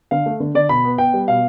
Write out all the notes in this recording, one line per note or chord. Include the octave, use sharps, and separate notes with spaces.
D3 F5
A3
D3
D3 D5
B2 B5
B3
B3 G5
G3
B2 F5